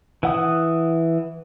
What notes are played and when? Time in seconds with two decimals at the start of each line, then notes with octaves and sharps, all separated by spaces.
0.23 E3 F#5 D#6